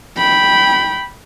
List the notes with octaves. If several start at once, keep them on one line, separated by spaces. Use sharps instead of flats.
G5 B5